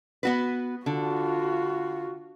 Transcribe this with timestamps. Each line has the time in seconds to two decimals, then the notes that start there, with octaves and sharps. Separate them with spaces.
0.23 B3 F#4 B4
0.86 D3 F4 F#4